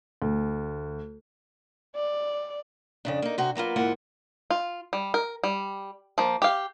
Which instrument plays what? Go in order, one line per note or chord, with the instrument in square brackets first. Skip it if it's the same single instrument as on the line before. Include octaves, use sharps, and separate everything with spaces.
[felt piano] D2
[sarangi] D5
[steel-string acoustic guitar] F2 C#3 D4
A#3 D#4
C3 F#4 C5
F#3 A#3 B3 F4
D2 G#2 E3 A#3 F4 F#5
[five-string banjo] F4
G3
A#4
G3
F3 A#3
G4 F5